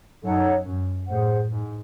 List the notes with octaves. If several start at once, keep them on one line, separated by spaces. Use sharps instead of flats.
F#2 D#4 A4 C#5 F#5
F#2
A2 G#4 C5 F#5
G#2